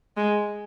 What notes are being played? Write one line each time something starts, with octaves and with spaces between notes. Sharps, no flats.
G#3